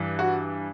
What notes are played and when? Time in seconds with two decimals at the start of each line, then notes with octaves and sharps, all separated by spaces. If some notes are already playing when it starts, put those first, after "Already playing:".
Already playing: G2 E3
0.19 F#4